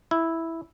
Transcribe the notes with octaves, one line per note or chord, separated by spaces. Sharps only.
E4